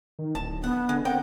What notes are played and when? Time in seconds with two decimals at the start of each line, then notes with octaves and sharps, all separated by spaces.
0.19 D#3
0.35 D1 A5
0.64 B3 F#5
0.89 D3 G#3
1.05 C4 A#4 F#5 G5